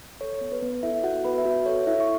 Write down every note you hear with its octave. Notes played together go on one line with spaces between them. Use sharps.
A4 C#5
B3
B4
B3
E4 A4 E5
F#4 A4 F#5
B3 B4 B5
E5
B3 F#4 F#5
A4 C#5
E4 A4 E5
C#6